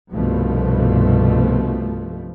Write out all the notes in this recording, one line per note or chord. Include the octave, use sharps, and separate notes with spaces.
C2 G2 B2 F3 A3